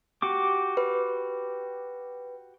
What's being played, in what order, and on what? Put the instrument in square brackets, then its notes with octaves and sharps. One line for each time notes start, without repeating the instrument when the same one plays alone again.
[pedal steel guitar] F#4 G4 D6
[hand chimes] B4